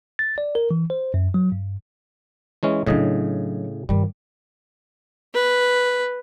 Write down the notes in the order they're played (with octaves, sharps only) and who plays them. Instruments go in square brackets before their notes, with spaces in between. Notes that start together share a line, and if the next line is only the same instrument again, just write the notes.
[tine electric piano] A6
D5
A#4
E3
C5
F#2
F#3
G2
[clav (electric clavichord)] E3 G#3 C#4
[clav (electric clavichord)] A2 C#3 D#5 [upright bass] F#3 D4
[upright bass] G2 D#3 [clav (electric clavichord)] G3
[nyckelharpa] B4